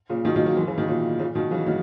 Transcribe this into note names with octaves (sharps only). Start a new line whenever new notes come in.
A#2 C#3
B2 D#3
D#3 F#3
F#3 A#3
E3 G#3
C#3 E3
B2 D#3
A#2 C#3
A#2 C#3
B2 D#3
C#3 E3
D#3 F#3